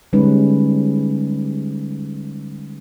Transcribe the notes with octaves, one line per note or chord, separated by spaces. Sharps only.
D3 G3 G#3 C#4 D#4 B4